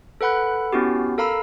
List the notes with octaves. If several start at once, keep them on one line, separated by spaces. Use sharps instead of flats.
A4 B4 F#5 B5 F#6
B3 C#4 E4 F#4 G4
A4 A#4 F5 A#5 B5 E6